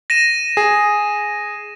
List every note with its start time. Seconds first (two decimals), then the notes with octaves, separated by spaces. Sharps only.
0.10 A#6 D#7 E7
0.57 G#4